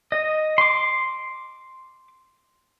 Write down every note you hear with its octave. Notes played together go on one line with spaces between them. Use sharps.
D#5
C6 D6